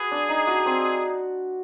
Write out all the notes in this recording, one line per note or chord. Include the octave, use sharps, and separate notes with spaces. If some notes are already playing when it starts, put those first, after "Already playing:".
Already playing: F#4 G#4 B4
D4
D#4
F#4
C4